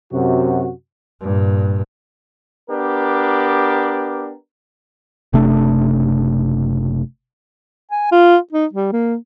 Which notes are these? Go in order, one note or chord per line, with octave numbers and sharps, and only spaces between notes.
F#2 C3 F#4
G2 A#2
B3 D4 G4 A#4
F#1 C3 A3 D4
G#5
F4
D#4
G3
A#3